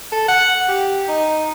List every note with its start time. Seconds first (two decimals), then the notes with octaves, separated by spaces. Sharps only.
0.12 A4
0.28 F#5
0.69 G4
1.08 D#4